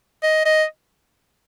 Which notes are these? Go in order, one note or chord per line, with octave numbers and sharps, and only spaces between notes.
D#5
D#5